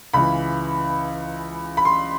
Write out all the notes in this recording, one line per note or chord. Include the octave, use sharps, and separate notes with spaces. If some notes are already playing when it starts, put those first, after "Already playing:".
C#2 C#3 E3 B5
B5
C6